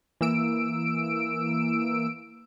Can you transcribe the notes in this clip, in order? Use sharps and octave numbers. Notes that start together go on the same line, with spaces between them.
E3 A#3 E6 D7